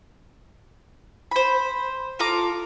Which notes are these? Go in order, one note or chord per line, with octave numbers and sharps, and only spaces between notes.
C5 B5
F4 A4 A#5 D6